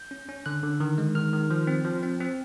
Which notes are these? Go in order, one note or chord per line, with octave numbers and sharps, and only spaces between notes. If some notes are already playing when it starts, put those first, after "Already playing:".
Already playing: G6
C#4
C#4
D3 F#6
D3
D#3
G#3
D#3 F6
D#3
F3
C4
F3
C4
C4